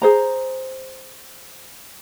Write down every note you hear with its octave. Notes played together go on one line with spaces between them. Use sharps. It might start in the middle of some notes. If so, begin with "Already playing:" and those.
G#4 C5 A#5